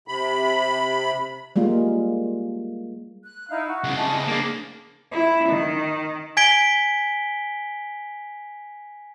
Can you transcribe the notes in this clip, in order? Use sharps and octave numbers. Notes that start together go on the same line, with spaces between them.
C3 B5
G3 G#3 A#3 F4
F#6
D#4 E4 F5
F#4
C2 C#3
D#5 A5
A#3 D4 G#4 D6
E4
D#3
G#5 G#6 B6 D7 G7